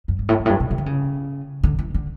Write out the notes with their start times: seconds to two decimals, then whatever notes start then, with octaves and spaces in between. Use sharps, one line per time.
0.08 F#2
0.19 G2
0.29 A2
0.39 G2
0.46 A2
0.50 G2
0.60 B2
0.71 C#3
0.78 D3
0.86 C#3
1.63 D3
1.79 E3
1.94 D3